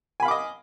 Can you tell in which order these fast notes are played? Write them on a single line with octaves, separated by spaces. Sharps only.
G#5 B5 F5 D6 D#5